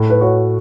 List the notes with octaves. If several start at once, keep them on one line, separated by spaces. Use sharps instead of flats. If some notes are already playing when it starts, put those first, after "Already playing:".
Already playing: A2
B4
F#4 C#5